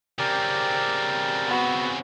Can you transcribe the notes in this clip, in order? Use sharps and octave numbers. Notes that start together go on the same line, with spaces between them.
C#3 C4 G4 A#4 D5
B3 F#4